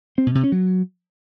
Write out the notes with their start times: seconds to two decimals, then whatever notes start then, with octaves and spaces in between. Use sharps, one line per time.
0.18 C4
0.26 B2
0.35 C3
0.44 C#4
0.52 F#3